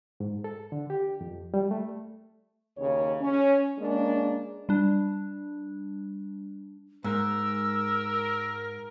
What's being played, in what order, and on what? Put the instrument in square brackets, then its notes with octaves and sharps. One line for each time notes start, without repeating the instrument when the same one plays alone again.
[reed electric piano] G#2
A4
D3
G4
F2
G3
A3
[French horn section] D#2 C#3 C#5
C#4
G#3 A#3 C#4 D4
[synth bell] G3 D4
[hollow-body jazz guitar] G#2 [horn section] A#4 [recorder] E6